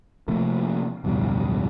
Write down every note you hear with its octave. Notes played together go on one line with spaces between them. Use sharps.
C3 F3 A3 A#3
D1 F2 B2 G3